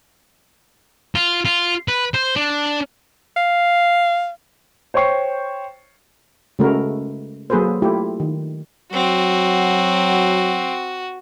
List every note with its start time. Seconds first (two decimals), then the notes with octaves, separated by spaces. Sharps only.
1.15 F4
1.45 F4
1.88 B4
2.14 C5
2.36 D4
3.37 F5
4.94 C5 C#5 G5 C#6 C7
6.59 C#3 G#3 A3 F#4 A#4 B4
7.50 F#3 A#3 G#4 A4 B4 C5
7.82 A3 E4 F4 G4
8.20 D#3
8.93 F#3 C4 F#4